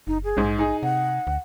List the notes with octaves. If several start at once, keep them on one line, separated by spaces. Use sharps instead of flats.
F#1 D#4
G#4
A#1 G#2 G#3
D#4 G#4 G#5
C3 F#5
D2